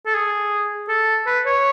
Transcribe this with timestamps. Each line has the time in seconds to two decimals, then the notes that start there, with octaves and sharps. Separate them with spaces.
0.06 A4
0.14 G#4
0.88 A4
1.27 B4
1.46 C#5